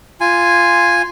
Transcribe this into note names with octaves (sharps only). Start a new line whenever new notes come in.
F4 G#5